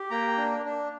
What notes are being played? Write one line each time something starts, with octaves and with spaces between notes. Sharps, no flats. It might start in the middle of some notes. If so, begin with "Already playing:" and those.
Already playing: G4
A#3 G5 A#5
D4
D4